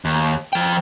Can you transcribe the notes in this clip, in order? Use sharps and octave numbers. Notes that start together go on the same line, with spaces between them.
D#2
F3 G5